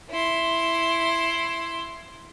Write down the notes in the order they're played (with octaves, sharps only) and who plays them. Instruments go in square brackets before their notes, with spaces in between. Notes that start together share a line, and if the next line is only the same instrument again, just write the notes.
[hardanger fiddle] E4 C6